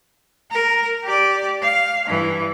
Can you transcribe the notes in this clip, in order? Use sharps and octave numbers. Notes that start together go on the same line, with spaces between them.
A#4
G4 D5
F5
G2 E3